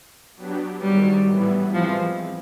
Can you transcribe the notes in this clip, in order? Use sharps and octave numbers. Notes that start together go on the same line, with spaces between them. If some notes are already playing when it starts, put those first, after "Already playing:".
F#3 B3 D4 G4
G#2 D#3 F#3 G3
A2 E3 G3 B3 E4
E3 F3 G#3 C4